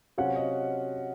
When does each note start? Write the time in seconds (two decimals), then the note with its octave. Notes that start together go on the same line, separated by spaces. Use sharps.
0.18 C3 F#3 C#4 F4 F#5
0.36 D#5